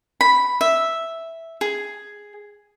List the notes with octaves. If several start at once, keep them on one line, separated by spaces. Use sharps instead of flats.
B5
E5
G#4